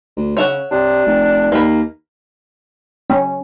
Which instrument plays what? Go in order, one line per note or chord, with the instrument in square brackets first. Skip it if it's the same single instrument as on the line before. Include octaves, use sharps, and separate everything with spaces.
[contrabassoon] D2
[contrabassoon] C#3 [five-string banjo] C#5 E5 F#5
[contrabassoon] C3 [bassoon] D4
[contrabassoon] F1
[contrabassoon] D#2 [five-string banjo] A#3 B5
[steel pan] C#4